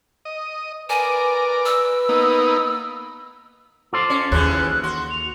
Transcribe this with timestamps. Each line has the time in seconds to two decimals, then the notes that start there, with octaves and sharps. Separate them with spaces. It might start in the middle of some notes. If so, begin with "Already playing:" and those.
0.25 D#5
0.89 A#4 B4 D5 G#5
1.66 E6
2.09 A#3 B3 D#4
3.93 F4 A4 C5 D6
4.10 C#4
4.32 D#2 C#3 E3 F#3 F#6
4.83 F#4 C6
5.10 F7